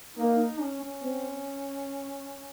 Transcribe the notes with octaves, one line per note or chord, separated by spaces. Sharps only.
A#3 D#4
D#4
C#4
C#4
C4